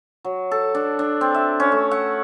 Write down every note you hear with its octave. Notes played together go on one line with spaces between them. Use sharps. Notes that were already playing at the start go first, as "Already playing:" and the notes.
F#3
A4
D4
D4
C4
E5
C#4
A3
F#5